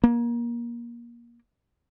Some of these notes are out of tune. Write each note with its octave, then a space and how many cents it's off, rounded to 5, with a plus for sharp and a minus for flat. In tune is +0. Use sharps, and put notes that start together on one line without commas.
A#3 +25